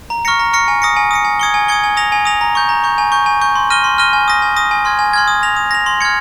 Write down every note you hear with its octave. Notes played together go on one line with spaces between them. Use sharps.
A#5
C#6 F6 A#6 C#7
A#5
C#6 F6 A#6 C#7
G#5
D#6 A#6 C#7
G#5
D#6 A#6 C#7
G#5
D#6 G#6 C#7 G7
G#5
D#6 G#6 C#7 G7
G#5
D#6 A#6 F7
G#5
D#6 A#6 F7
A#5
C#6 G6
A#5
C#6 G6
G#5
C#6 G6
G#5
C#6 G6
C6
F6 A#6 D#7 G7
C6
F6 A#6 D#7 G7
G#5
D#6 A#6
G#5
D#6 A#6
G#5
C6 F6 G#6
G#5
C6 F6 G#6
D#6
A#6 F7
D#6
A#6 F7
C6
F6 G#6 C#7